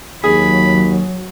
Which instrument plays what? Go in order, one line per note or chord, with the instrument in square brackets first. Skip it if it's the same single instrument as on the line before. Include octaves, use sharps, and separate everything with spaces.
[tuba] D#2 [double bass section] F#3 [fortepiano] G#4 [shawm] B5